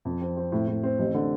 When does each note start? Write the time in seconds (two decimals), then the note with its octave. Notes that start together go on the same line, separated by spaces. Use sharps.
0.05 F2
0.21 C4
0.37 C4
0.52 A2
0.67 A2
0.83 C4
0.99 A1
1.14 D3